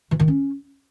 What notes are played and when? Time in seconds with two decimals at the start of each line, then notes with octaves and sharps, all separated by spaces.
0.11 E3
0.20 D#3
0.28 C#4